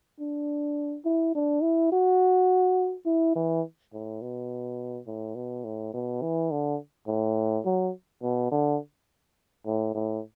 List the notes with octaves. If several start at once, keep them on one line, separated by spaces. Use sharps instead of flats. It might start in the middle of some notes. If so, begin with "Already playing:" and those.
D4
E4
D4
E4
F#4
E4
E3
A2
B2
A2
B2
A2
B2
E3
D3
A2
F#3
B2
D3
A2
A2